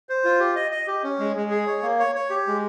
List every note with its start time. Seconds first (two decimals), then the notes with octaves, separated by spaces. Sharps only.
0.09 C5
0.24 F4
0.40 G4
0.55 D#5
0.71 D#5
0.87 G4
1.03 C#4
1.19 G#3
1.36 G#3
1.51 G#4
1.66 C#5
1.82 A#3
1.99 C#5
2.15 C#5
2.30 G4
2.47 G#3